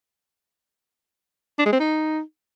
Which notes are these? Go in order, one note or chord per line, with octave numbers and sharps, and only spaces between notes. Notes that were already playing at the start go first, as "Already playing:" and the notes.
D4
G#3
C4
D#4